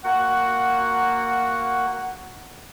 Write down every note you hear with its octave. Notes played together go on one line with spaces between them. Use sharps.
A#3 F#4 F#5